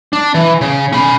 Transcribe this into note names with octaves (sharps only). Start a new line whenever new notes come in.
D4
E3
C#3
C#4 B5